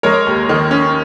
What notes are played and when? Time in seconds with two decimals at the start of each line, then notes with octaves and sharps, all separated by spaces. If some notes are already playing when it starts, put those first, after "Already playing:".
0.03 G#3 A#4 C#5
0.27 D#2
0.49 D#3
0.71 C#4